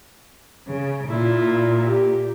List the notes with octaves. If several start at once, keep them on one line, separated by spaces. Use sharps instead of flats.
C#3
A#2 E4 F4
G4